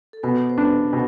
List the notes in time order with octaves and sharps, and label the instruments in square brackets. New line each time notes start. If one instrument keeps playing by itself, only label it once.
[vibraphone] A4
[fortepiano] B2 [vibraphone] B3 B4
[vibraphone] C5
[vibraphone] B3 B4 [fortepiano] D4
[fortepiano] B2